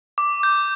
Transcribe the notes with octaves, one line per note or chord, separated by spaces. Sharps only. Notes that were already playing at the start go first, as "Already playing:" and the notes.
D6
G6